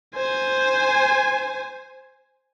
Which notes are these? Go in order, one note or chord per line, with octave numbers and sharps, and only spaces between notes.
C5 G#5